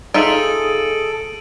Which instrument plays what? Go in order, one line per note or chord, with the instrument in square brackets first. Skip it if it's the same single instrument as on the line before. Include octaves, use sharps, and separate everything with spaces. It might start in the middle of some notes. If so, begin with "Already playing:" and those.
[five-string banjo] D#4 F4 E5 [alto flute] G#4 [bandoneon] A4 [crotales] D7 D#7 F#7